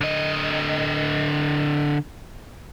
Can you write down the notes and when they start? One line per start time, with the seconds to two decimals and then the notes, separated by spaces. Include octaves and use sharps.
0.01 D3 D#5